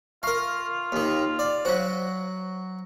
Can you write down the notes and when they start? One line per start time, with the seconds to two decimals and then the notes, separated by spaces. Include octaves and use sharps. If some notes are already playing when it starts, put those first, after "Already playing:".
0.23 F4 A#4 E5 F5 C#6
0.92 D#2 D#3
1.39 D5
1.65 F#3 F#4 C5 F5